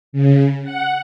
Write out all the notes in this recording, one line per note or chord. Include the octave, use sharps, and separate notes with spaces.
C#3
F#5